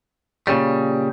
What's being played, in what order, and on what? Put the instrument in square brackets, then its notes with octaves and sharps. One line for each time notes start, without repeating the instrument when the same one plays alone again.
[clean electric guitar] A#2 C#3 G3